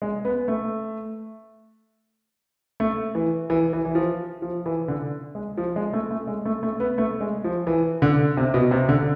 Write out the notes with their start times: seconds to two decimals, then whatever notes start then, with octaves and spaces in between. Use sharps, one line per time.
0.02 G#3
0.25 B3
0.48 A3
2.80 A3
3.15 E3
3.50 E3
3.73 E3
3.85 E3
3.95 F3
4.42 F3
4.66 E3
4.88 D3
5.35 G#3
5.57 F3
5.76 G#3
5.93 A3
6.11 A3
6.27 G#3
6.45 A3
6.63 A3
6.80 B3
6.98 A3
7.21 G#3
7.44 F3
7.67 E3
8.02 D3
8.37 C3
8.54 B2
8.71 C3
8.89 D3